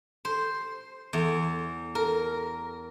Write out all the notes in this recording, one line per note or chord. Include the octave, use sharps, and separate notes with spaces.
C5
E2
A#4